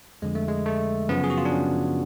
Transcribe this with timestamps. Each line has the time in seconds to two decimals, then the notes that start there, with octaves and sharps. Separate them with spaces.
0.22 F2 D3 F3 G#3
0.35 A3
0.48 G#3
0.66 A3
1.09 F#2 C#3 F3 B3
1.24 G#4
1.30 F#4
1.37 F4
1.45 D4
1.52 C#4